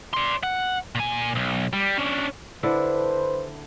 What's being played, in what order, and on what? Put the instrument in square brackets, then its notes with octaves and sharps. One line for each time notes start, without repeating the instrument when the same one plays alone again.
[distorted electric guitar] D5 C6
F#5
A#2 G#5
B1
G3
C#4 D4
[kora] D3 D4 E4 [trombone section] B4 C5